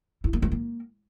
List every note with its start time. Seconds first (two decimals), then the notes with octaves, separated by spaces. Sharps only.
0.24 E4
0.33 A#3
0.42 A3
0.52 A#3